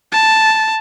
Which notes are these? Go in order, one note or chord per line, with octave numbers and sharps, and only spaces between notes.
A5